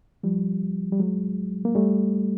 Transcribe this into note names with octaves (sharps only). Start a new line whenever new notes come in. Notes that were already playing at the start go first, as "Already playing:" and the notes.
F3 G3
G3
F#3 G#3
A#3
G3 A3